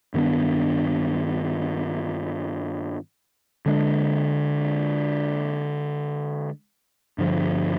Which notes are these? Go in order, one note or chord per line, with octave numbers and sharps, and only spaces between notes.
G2 D#3 B3 D4
D3 G#3 D4
G2 D3 F3